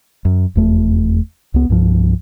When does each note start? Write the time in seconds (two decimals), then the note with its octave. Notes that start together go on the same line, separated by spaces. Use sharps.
0.25 F#2
0.55 F1 E2 A3
1.54 C#2 B3
1.70 C2 G2 F3